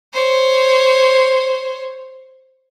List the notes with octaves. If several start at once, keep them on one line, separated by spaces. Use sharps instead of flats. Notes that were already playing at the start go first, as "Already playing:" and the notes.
C5 C#5